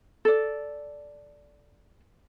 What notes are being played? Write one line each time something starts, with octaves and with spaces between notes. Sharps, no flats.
A4 D5